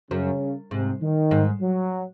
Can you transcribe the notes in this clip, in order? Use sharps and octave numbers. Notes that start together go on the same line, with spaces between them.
F#2 C#3
G#2 C3
D#3
G#2
F#3